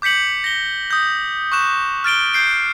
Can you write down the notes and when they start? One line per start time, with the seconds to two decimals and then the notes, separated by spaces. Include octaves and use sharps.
0.02 D6 G6 B6 C#7 F#7
0.44 A#6 G7
0.91 D#6 G6
1.52 C#6 D6 F#6 E7
2.04 F6 A6 D7 G7
2.34 G6 C7 D7